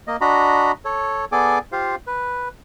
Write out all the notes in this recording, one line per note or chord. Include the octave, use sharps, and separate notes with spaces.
A#3 D#5
D4 F#4 D#5 A#5 B5
A4 C#5
B3 G#4 A4 D5 G#5 D6
F4 G4 C5 F5
B4